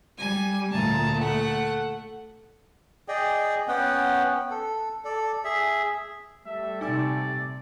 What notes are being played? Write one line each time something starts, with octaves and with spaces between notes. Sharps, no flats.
G3 G#5
D2 A#2 A5 A#5
A3 F#5
G#4 D5 D#5 G5
B3 C#4 F#5 G5
A4
A4 D5
G#4 E5
G3 A3 A4 E5
C3 D#4 D5 G#5 E6